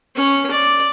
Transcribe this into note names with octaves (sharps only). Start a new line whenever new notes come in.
C#4
D5